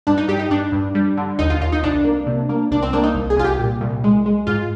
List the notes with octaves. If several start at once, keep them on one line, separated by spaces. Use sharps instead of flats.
G2 D4
D#4
G2 G4
D#4
G2 D4
G2
G3
D3
D#2 D#4
F4
D#2 F4
D#4
C2 D4
A#3
C3
A#3
C2 D4
C4
A#3 D4
D#4
C2
G#4
C2 F4
G4
A#2
C2
G#3
G#3
G#2 F4